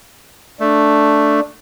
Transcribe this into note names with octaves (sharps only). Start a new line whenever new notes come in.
A3 D4